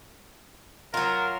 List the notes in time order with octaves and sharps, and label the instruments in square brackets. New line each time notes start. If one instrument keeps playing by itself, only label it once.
[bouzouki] F#3 F4 [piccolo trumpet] A#4